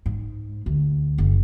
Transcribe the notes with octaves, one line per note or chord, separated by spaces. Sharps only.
G#2
D2
F#1